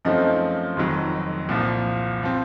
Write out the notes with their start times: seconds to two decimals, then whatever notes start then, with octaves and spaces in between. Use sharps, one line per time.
0.05 F#2 F3 A3 C4 D#4 D#5
0.77 F1 F2 D#3 F#3
1.49 C2 A#2 F3
2.23 F3 C4